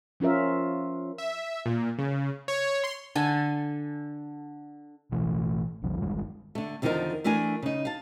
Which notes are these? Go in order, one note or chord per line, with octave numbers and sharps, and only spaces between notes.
F3 C#4 F4 A#4 E5
E5
A#2
C#3
C#5
C6
D3 A4 G#5
A1 B2 E3 A3
A#1 E2 D3 F3
G1 D#3 G3 G#3
D3 A3
E2 D3 D#3 F3 D#4 A#4
E3 A3 D4 A#4 G#5
C#3 D#4
F5 A5